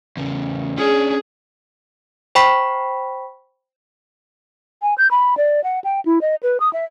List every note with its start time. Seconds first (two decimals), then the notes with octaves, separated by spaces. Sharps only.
0.17 E2 C#3
0.78 C#4 D4 G#4
2.35 C5 G5 B5 C#6 B6
4.82 G#5
4.98 G6
5.11 B5
5.37 D5
5.64 F#5
5.84 G5
6.05 E4
6.21 D#5
6.43 B4
6.60 D#6
6.73 E5